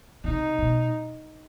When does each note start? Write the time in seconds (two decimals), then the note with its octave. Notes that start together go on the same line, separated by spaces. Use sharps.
0.24 C3 D#4
0.58 B2